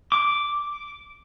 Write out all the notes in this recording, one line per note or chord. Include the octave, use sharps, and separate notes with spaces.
D6